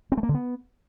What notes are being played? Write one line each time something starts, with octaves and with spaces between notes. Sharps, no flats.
C4
A3
A#3
D3
B3